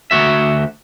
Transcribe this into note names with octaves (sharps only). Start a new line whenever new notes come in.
D2 B2 F#4 E5